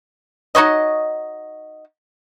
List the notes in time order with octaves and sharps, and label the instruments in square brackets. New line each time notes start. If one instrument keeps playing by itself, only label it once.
[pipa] D#4 F#4 C#5 D#5